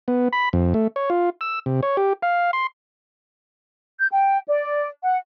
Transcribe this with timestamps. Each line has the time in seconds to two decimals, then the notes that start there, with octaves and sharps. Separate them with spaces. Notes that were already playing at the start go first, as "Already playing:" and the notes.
0.08 B3
0.33 B5
0.53 F2
0.74 A3
0.96 C#5
1.10 F4
1.41 E6
1.66 C3
1.83 C#5
1.97 G4
2.22 F5
2.53 C6
3.99 G6
4.12 G5
4.48 D5
5.03 F#5